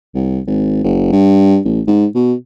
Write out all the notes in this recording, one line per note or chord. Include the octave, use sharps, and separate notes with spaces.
C2
G#1
F#1
G2
A1
G#2
B2